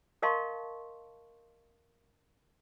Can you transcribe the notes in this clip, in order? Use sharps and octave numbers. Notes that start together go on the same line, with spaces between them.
A#4 D#5 F5 A5 C6 C#6